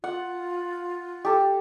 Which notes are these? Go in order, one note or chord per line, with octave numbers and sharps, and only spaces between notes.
F4 F#5
G4 A4